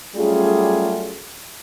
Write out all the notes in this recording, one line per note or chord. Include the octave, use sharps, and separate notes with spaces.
F#3 G3 A3 C#4 F4 G#4